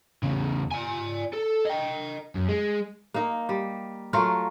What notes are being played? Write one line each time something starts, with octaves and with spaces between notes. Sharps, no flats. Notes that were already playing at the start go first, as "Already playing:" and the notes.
E2 C#3
D5 G#5
A4
D#5 G5
F#2
G#3
A#3 D#4
G3
F#3 A3 F4 A#4